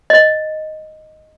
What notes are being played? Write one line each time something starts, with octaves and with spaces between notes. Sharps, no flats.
D#5